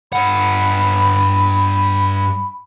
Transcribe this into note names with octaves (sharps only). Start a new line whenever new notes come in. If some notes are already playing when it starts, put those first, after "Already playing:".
G2 F#5 B5